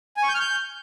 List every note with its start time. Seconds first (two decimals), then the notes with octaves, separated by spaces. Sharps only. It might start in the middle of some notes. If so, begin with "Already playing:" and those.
0.17 G#5
0.23 C#6
0.29 G6
0.34 F6
0.40 G6